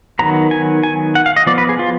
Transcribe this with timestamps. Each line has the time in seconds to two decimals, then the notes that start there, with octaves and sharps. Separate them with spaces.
0.19 D#3 F#3 B3 A#5
0.51 G#5
0.83 G#5
1.15 F#5
1.26 F5
1.36 D#5
1.46 F3 B3 D5
1.58 B4
1.69 G#4
1.79 F4